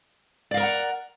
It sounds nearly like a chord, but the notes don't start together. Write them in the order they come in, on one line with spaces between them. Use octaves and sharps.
D5 F5 A#4 A#5 F#5